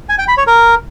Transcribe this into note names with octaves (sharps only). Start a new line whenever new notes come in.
G#5
G5
B5
C#5
A#4